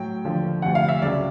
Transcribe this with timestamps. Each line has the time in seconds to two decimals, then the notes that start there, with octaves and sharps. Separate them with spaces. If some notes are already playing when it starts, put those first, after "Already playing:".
Already playing: A2 F#3 G5
0.24 D#2 D3 F3
0.62 D2 C3 F3 F#5
0.75 F5
0.89 E5
1.02 C#2 C#3 F#3 D5